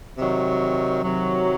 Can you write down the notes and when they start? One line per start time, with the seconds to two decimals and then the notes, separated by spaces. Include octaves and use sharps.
0.18 C3 D#3 F#3
1.03 C3 D#3 F#3